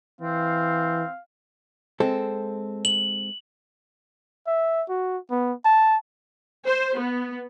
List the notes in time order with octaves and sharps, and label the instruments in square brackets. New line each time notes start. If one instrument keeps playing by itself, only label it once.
[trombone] E3 [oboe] C4 [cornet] F5
[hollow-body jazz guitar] G#3 C4 A4
[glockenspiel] F#7
[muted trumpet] E5
F#4
B3
A5
[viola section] C5
B3